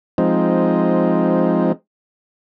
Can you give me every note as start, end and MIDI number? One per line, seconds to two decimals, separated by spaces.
0.18 1.72 53
0.18 1.72 56
0.18 1.72 60
0.18 1.72 63